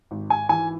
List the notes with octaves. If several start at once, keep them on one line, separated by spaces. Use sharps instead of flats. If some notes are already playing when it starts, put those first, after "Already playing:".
G#1
G#5
E3 G#5